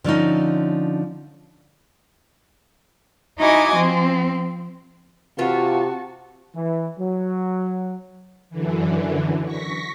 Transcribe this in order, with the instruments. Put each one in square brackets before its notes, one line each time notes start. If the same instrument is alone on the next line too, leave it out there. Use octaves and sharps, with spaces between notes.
[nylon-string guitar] D3 F3 C#4 D#4
[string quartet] D#4 E4 F#4 D#5 G#5 D6
F3 C4
[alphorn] C3 [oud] E3 F4 B4 [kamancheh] F#4 A5
[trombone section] E3
F#3
[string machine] F#2 D3 E3
C#6 A#6 B6